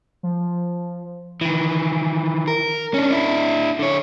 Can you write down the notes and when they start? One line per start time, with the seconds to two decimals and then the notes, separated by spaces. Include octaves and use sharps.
0.23 F3
1.41 D#3 E3
2.48 A#4
2.94 C#4 D4
3.11 D4 E4
3.79 D3 C#5